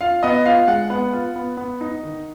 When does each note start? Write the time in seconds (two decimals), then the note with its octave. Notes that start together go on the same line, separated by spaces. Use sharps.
0.01 F4 F5
0.23 B3 D#5
0.46 F4 F5
0.68 G#3 F#5
0.90 B3 F#5
1.13 F4
1.36 B3
1.57 B3
1.81 D#4
2.03 D#3